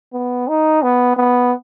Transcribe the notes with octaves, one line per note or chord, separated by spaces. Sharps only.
B3
D#4
B3
B3